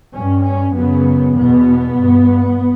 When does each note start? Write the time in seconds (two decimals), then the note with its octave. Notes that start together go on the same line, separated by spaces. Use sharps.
0.15 G2 C#4
0.46 C#4
0.76 F#2 C#3 B3
1.36 E2 B2 B3
1.97 G2